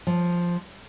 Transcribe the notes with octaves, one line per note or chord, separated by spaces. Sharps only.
F3